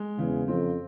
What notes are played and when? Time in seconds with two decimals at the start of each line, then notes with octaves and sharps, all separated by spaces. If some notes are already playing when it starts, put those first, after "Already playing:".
Already playing: G#3
0.18 E2 C#3
0.48 F2 C4